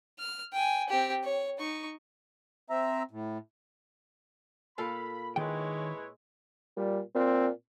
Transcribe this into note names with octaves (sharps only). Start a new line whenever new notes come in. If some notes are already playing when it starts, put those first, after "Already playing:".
F6
G5 G#5
C4 G4
C#5
D#4 C#6
C4 E5 A#5
A2
A#2 A4 F5 B5
D#3 G#3 E4 B4 C#5 G5
A#2 G3
A#2 C4